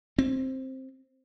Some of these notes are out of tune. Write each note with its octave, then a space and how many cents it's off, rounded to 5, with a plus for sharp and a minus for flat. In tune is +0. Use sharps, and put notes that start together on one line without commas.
C4 +10